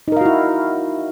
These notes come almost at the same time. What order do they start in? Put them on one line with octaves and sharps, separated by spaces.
D#4 A#4 F5 F#4 E4